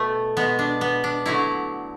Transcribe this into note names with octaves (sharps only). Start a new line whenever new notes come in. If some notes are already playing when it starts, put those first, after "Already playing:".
Already playing: B2 A3 B3
B2 G#3 B3
D4
B3
D4
D3 F#3 A3 E4